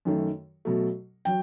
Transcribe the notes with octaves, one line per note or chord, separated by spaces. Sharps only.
F#2 D#3 A3
B2 F#3 A3
F#3 G5